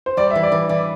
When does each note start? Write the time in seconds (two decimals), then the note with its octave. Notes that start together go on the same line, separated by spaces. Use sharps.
0.06 C5
0.17 G3 D5
0.31 E5
0.35 E3
0.43 D5
0.52 E3
0.69 E3 D5